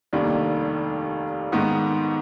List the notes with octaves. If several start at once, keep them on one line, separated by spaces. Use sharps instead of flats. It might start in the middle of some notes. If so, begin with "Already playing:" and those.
F1 D#2 D#3 G3 D4
G#2 D#3 B3